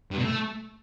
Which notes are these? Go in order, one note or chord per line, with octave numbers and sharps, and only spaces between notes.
G2
B2
A3